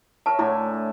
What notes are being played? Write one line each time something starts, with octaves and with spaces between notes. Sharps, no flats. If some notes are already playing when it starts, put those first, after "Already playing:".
A#4 C#5 E5 A5
A2 D3 E4 G#5